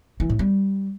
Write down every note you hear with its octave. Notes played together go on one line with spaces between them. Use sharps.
E3
A2
G3